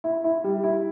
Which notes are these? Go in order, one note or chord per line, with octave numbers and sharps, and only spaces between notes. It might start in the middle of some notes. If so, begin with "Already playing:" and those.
E4
E4
G3
E4